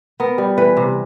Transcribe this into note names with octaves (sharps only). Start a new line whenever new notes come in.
B3 A#4
G3
E3 B4
C3